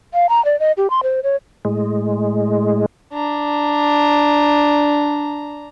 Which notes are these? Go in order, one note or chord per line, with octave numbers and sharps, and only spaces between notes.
F5
A#5
D5
D#5
G4
C6
C5
C#5
A2 G#3
D4 A#5